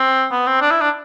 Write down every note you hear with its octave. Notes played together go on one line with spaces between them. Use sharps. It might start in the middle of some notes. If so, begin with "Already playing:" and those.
Already playing: C4
B3
C4
D4
E4
D4